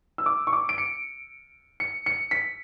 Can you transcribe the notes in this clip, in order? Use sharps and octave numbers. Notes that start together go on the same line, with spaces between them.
E6
D6
C#6
D6
D7
C#7
C#7
C#7
B6